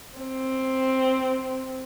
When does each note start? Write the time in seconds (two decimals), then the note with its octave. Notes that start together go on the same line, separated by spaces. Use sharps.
0.18 C4